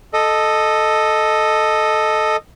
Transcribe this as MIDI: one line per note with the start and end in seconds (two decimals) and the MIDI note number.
0.13 2.36 69
0.13 2.36 75